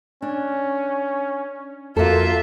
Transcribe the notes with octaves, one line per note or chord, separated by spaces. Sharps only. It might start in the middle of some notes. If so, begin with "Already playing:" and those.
C#4 D4
F2 A#3 F4 F#4 A4 E5